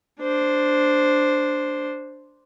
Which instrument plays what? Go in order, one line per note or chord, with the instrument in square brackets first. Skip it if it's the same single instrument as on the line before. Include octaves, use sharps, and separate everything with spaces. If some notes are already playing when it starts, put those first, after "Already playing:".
[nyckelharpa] D4 C5